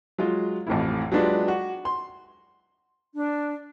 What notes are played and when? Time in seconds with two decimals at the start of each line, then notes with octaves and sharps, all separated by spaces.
0.18 F#3 G#3 F4
0.67 A1 F2 A2 E4
1.12 F#3 G#3 B3 D4 F4 G4
1.48 F#4
1.85 C6
3.14 D4